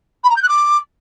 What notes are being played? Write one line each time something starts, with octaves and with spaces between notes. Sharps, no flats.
B5
A#5
G6
F#6
D6